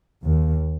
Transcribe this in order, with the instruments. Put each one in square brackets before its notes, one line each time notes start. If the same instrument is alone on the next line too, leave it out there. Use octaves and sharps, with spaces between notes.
[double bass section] D#2